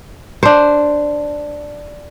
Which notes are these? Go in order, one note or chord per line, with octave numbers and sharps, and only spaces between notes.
D4 C5